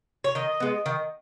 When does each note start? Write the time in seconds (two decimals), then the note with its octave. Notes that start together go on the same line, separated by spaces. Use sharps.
0.24 C#5
0.35 D#3 D#5
0.60 G#3 B3
0.86 D#3